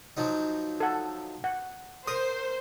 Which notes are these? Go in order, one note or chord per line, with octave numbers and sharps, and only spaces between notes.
F3 F#3 D#4
A4 F#5
F#5
A#4 C5 D#6